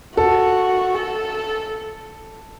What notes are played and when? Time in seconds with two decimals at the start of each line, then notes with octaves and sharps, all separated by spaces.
0.16 F#4 A4
0.95 A4